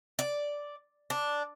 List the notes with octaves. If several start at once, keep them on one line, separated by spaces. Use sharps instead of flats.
D5
D4